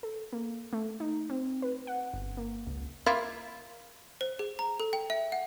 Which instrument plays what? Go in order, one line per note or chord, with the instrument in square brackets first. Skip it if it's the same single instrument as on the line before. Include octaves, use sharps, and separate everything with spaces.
[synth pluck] A4
A#3
A3
D#4
C4
B4
F#5
G1
A#3
C#2
[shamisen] A#3 E4 F4
[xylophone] C5
G#4
A#5
A4
G5
E5
F#5